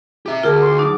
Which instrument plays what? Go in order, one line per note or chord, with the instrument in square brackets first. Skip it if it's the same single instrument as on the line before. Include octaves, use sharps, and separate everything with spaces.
[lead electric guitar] G4 E5
[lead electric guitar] D2 [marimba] F4 G#4 A5 [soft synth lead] A#4
[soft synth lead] C6
[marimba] F#3 D#4 [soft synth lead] D6